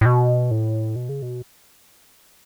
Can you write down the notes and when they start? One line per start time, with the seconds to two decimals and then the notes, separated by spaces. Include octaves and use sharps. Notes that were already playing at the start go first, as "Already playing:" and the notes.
0.01 A2
0.06 B2
0.51 A2
0.96 B2
1.09 C#3
1.22 B2